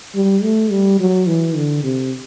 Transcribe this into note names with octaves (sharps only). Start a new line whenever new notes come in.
G3
A3
G3
F#3
E3
D3
C3